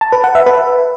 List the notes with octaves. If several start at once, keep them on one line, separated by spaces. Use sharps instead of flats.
A5
B4
F#5
E5
B4